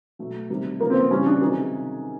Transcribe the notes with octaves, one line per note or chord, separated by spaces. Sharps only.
B2 F#3 A3
C3 D#3 G3
C#3 F3 A#3
C4
B3
C#3 E3 G3 C#4
D4
C3 D#3 F#3 G#4